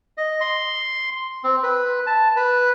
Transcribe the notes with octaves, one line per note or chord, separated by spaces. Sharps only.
D#5
C6
C4
B4
A5
B4